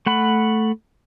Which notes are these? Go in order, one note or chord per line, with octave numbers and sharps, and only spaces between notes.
A3 F#5 B5